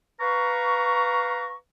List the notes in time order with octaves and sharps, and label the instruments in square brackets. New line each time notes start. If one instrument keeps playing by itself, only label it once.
[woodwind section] B4 F5 A#5 C#6